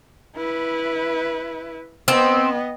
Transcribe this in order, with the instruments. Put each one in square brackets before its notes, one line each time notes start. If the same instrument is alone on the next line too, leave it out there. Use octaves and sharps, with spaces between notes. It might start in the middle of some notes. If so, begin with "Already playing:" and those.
[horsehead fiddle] E4 B4
[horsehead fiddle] B3 D#5 [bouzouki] C4